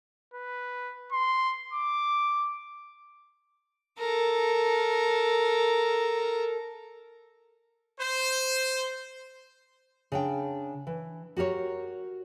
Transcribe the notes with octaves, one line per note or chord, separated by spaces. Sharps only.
B4
C6
D6
A4 A#4
C5
C#3 D4 G5
E3
F#4 G4 A#4 C#5